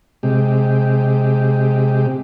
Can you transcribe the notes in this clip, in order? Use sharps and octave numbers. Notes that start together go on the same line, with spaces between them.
C3 G#3 G4